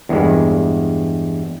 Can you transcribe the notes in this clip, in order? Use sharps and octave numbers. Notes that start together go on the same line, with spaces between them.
E2 G2 G#3